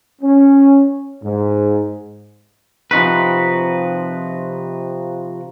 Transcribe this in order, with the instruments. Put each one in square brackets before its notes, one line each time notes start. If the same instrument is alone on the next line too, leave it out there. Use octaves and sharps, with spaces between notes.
[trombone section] C#4
G#2
[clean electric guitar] C3 F3 D#4 F#4 B4